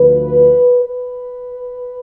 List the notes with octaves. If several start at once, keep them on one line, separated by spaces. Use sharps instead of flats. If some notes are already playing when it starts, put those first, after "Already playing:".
Already playing: D2 D3 F3 B4
B4